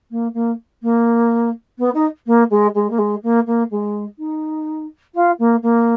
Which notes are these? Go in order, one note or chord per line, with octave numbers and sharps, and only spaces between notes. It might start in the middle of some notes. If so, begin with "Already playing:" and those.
A#3
A#3
A#3
B3
D#4
A#3
G#3
G#3
A#3
G#3
A#3
A#3
G#3
D#4
F4
A#3
A#3